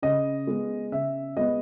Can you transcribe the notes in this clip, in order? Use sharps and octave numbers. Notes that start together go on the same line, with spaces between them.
C#3 D#5
G#3 B3
C#3 E5
G#3 B3 D#5